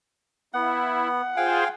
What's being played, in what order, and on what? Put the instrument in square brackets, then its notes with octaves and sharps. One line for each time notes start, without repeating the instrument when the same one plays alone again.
[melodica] B3 [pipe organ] E4 [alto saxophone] F#5
[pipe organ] F4 G#4 C5 [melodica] F5 G5 G#5